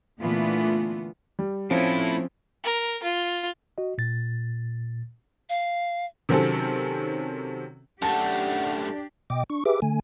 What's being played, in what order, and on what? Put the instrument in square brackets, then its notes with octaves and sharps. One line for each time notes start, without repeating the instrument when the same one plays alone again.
[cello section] A#2 D3 E3 A3 B3 F4
[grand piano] G3
[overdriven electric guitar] A2 E4 [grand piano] F3 C4 C#4
[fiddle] A#4
F4
[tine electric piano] F#4 D#5
A#2 A6
[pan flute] F5
[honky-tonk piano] C3 D#3 F#3 C4 C#4 A4
[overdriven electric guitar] F#2 A3 [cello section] D4 G4 [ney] F#5 [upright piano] A5
[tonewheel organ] B2 D#5 G5 D6
D4 C#6
G4 G#4 B4 E5 D6
D3 A3 G#5